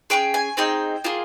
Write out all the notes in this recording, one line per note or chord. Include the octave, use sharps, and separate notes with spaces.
C#4 F4 G#4 G5
G#5
C4 D#4 G#4 G5
A#3 F4 G#4